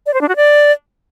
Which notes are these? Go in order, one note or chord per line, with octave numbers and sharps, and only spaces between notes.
D5
C5
D4
F#4
D5